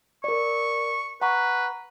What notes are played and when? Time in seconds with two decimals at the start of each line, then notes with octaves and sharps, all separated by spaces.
0.24 A#4 D5 C#6
1.21 B4 F#5 A#5 C#6